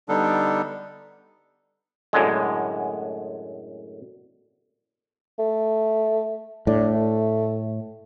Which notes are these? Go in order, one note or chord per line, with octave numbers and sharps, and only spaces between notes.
D3 G3 B3 D4 D#4 A4
F#2 A2 D3 G#3
A3
A2 D4
A3